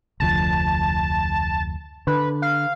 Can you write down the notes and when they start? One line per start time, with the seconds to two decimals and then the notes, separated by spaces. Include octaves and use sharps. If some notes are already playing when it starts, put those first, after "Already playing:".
0.20 F1 D2 F3 A5
2.07 D3 B4
2.42 F5